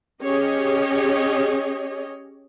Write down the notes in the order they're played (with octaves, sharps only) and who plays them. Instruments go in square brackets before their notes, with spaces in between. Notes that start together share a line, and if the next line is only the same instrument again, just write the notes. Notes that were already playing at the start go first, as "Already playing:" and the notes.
[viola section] C#4 G4 G#4 C#5 D#5